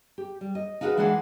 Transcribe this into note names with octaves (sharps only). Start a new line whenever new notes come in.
G4
G3
D#5
D#4 F4 F#4 G#4 A#4 B4
E3 G#3 D4 G#4 F#5